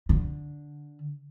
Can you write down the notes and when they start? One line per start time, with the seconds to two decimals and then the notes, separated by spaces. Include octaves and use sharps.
0.09 D3